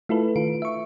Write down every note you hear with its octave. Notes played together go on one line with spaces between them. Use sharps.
A3 E4 F4 A4 B4
D#3 F4 D7
E5 C#6